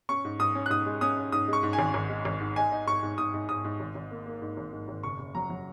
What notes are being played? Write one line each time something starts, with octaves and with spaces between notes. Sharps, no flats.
C#4 C#6
G#2
G#2 D#6
C#4
F#6
G#2 D#6
G#3
C#4 D#6
C#4
G#2 D#6
G#3 C#6
G#2
G#5
G#1
G#1
G#3
G#1
G#2
D#4 G#5
D#4
G#2 C#6
G#2
G#2 D#6
G#2
G#2 D#6
G#2
G#1
G#1
A#3
A#3
G#2
G#1
G#2
G#1
F#1 C#6
F#1
F#3 A#5
F#3